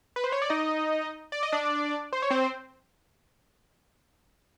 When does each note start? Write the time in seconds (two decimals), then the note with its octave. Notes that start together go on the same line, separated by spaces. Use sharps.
0.16 B4
0.24 C5
0.32 C#5
0.42 D5
0.50 D#4 D#5
1.32 D5
1.43 D#5
1.52 D4 D5
2.13 C5
2.22 C#5
2.31 C4 C5